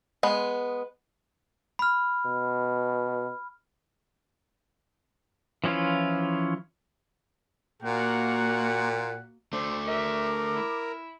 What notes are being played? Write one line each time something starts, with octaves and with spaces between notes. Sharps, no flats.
G#3 B3
B5 F6
B2
E3 F3 C#4 E4 F4
A#2 A#3 F#4 F#5
A3 D4 C5 D6
A#4 E5
E4